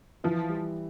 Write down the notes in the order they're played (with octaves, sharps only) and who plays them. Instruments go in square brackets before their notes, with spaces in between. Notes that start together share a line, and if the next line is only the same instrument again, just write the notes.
[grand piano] E3 [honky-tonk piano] F3
[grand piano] G3